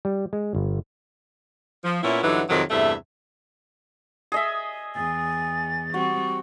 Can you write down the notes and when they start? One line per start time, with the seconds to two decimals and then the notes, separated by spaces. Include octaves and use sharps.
0.05 G3
0.33 G#3
0.55 G1
1.84 F3
2.03 A#2 B3 C#4 E4
2.23 G2 D3 E3 F#3 D#4
2.49 F2 C3 D#3 F#3 A#4
2.70 E2 G2 C3 A3 E5
4.32 G#4 D#5 E5
4.96 E2 G#5 A6
5.94 G3 C4 F#4 C#6